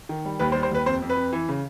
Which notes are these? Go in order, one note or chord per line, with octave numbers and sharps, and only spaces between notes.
D#3
G3
D#2 B4
C5
G3
C5
D#2 B4
F2 C5
F2
B4
F2
E3
C#3